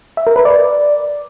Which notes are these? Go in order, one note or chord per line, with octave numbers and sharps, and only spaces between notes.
E5
A#4
B4
D5